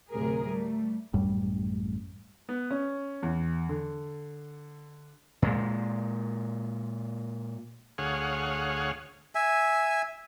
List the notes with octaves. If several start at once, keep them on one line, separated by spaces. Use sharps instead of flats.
D2 A2 C3 F#3 G#4 A#4
G3 A3
A1 F#2 A2 G3
B3
C#4
E2
D3
A#2 G#3
D2 G#4 C#5 F5 F#5
E5 G#5